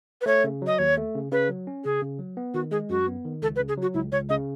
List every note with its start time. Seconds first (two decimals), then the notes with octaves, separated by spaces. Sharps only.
0.21 B4
0.26 A3 C#5
0.44 C#3
0.62 F#3 D#5
0.79 D#2 C#5
0.97 A3
1.15 C#3
1.32 C#3 B4
1.49 F#3
1.67 C#4
1.85 C#3 G#4
2.02 C#3
2.19 F#3
2.37 B3
2.54 D#3 F#4
2.71 G#3 G#4
2.90 F#2 F#4
3.07 B3
3.25 D#3
3.42 C#2 A4
3.56 B4
3.59 C#3
3.68 G#4
3.78 F#3 F#4
3.94 C#2 E4
4.12 C#2 C#5
4.29 C#3 D#5